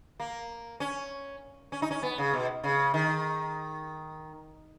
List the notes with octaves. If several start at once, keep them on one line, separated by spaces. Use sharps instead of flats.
A#3
C#4
C#4
D#4
C#4
B3
C#3
B2
C#3
D#3